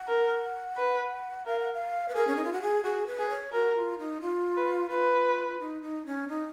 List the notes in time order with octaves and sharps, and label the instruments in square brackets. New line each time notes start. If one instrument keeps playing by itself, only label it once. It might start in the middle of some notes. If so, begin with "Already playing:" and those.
Already playing: [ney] F#5
[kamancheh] A#4
B4
[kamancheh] A#4 [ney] F5
[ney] F#5
F5
B4
[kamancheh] G#4 [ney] A#4
[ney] C#4
D#4
F4
F#4
G#4
[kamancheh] F#4 [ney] G#4
[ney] B4
[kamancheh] G#4
[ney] C#5
[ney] F#4 [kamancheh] A#4
[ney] F4
D#4
F4
[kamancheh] B4
[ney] F4 [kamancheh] B4
[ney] D#4
D#4
C#4
D#4